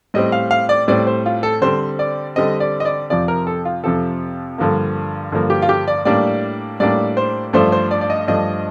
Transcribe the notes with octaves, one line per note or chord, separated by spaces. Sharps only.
A2 G3 C4 D#5
F5
F5
D5
A2 G3 C4 D5
C5
F4
A4
D3 G3 C4 C5
D5
D3 G3 C4 D#5
D5
D#5
D5
F2 C3 F3 D5
A#4
A4
F4
F2 C3 F3 A4
G2 D3 F3 A#3
G2 D3 F3 A#3
G4
F4
G4
D5
A2 G3 A#3 D4 D5
A2 G3 A#3 D4 D5
C5
G2 F3 A3 D4 C5
C5
D5
D5
D#5
G2 F3 A3 D4 D#5